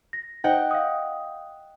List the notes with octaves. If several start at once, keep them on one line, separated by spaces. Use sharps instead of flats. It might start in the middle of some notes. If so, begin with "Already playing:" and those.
A#6
D#4 C5 D#5 F#5 G5
F5 D#6